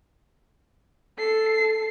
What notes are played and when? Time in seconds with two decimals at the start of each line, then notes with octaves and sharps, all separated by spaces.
1.18 A4 C7